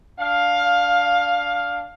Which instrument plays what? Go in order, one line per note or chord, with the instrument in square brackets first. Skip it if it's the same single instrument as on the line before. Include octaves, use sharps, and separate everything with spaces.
[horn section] D4 F5